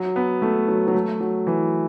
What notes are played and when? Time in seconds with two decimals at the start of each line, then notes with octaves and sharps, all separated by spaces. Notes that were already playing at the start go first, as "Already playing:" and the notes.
Already playing: F#3
0.16 B3
0.42 A3
0.68 F#3
0.88 F#3
0.94 A3
1.20 F#3
1.47 E3